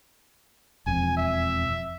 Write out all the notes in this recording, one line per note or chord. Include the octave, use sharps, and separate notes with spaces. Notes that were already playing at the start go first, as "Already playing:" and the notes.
E1 F2 G#5
E5